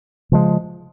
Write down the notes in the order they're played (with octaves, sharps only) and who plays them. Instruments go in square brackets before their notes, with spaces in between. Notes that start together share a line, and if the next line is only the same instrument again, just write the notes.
[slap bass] C#3 F3 G#3